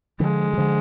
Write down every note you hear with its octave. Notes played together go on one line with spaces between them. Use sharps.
D3 F3 G#3
G3
D3 F3